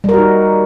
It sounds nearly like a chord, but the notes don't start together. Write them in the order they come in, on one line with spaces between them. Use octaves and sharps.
G3 A#4 F#4 D#4